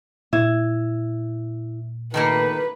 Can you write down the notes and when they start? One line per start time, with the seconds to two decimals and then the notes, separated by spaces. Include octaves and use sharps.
0.33 A#2 E4
2.14 D#3 A3 A#3 B4